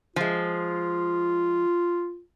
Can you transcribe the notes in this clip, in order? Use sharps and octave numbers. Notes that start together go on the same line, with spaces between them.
F3 G#3 F4